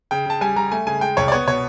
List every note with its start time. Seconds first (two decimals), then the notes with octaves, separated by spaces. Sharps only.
0.11 C#3 G5
0.26 C#3 A5
0.41 G3 G#5
0.56 G3 A#5
0.71 A3 G#5
0.87 C#3 G#5
1.01 G#3 G5
1.17 C2 C#5
1.28 D5
1.32 B3 C#5
1.47 B2 C#5